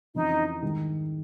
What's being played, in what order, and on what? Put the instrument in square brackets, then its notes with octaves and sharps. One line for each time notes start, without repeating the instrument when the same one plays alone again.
[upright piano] F2 C#3 E3 [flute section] D#4
[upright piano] G#2 D#3 G3